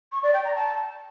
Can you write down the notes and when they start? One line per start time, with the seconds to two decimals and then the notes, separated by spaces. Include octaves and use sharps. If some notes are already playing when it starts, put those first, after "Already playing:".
0.12 C#6
0.23 D5
0.34 G5
0.45 A#5
0.55 A5